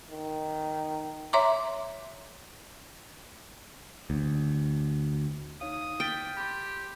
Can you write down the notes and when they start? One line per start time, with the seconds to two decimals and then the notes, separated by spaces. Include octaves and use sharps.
0.11 D#3
1.33 C#5 E5 A#5 C6 D6
4.10 D2
5.61 D#4 C#5 F5 D#6
6.00 G5 F6 A6 B6
6.37 G4 B5 C6